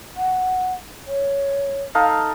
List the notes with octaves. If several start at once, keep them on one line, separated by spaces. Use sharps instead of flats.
F#5
C#5
D#4 A4 F5